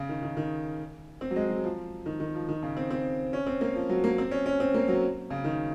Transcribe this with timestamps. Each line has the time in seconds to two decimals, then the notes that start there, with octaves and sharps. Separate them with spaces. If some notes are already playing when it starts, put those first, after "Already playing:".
Already playing: C#3
0.09 D#3
0.22 D#3
0.37 D#3
1.21 C4
1.31 F#3
1.36 G#3
1.50 F#3
1.64 F3
2.06 D#3
2.20 D#3
2.35 F3
2.48 D#3
2.63 C#3
2.77 C4
2.90 C4
3.33 C#4
3.47 C4
3.61 A#3
3.75 F3
3.89 F#3
4.04 A#3
4.18 C4
4.31 C#4
4.46 C#4
4.60 C4
4.74 A#3
4.88 F#3
5.30 C#3
5.44 D#3